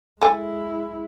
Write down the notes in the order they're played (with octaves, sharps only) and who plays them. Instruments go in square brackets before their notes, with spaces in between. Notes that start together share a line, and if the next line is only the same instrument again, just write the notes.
[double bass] G#3 E4 [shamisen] A4 G#5